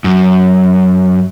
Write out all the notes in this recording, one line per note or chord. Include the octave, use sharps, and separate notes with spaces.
F#2